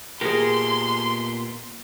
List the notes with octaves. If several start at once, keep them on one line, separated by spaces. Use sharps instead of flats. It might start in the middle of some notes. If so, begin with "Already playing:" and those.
A#2 B3 G4 G#4 A#4 C6